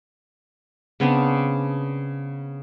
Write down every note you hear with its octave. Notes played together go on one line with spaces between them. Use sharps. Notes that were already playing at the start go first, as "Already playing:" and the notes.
C#3 B3 C4 D4